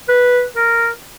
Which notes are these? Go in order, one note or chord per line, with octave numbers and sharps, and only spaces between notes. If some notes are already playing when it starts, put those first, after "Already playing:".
B4
A#4